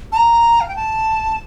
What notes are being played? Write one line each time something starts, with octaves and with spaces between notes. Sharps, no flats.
A5
A#5
F5
G5
A5